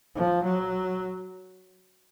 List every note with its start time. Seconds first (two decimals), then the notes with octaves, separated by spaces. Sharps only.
0.15 F3
0.43 F#3